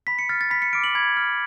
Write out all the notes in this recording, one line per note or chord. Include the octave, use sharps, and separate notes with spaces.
B5 B6
C#7
F6 A6
A6
B5 B6
C#7
D6 F6 D7
F#7
B5 G#6
F6